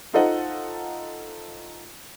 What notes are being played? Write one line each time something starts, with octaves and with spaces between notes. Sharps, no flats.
D#4 F4 A4 C5 D#5 F#5